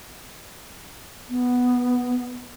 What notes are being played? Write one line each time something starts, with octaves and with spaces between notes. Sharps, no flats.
B3